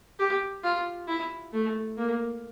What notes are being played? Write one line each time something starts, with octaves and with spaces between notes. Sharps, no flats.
G4
F4
E4
A3
A#3